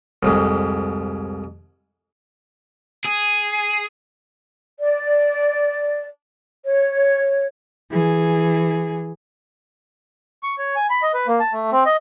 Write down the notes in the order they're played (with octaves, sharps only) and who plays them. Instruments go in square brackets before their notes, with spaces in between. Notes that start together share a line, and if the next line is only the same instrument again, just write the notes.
[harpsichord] C2 F2 G#2
[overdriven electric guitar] G#4
[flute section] D5
C#5
[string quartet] E3 G#4
[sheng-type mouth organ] C#6
C#5
G#5
B5
D#5
B4
A#3
A5
A3
C4
D#5